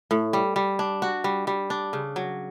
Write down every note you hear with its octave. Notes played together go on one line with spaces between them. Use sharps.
A2
G3
G3
D4
F#4
G3
G3
D4
C#3
F#3